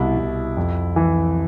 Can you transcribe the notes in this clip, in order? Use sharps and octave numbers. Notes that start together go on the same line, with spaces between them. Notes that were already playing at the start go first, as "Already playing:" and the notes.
Already playing: C2 B2 E4
C2
F2
E3